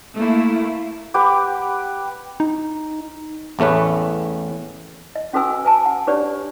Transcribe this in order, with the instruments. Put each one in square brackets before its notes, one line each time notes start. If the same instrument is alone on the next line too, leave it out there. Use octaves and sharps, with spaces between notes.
[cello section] A3 A#3 E4
[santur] G4 B4 F#5 D6
[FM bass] D#4
[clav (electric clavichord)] A1 E2 A3 C#4 B4
[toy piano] D#5
C#4 F#4 A4 B4 G#5 E6
B4 G#5 A5
F#5
D4 G4 B4 C#5 D5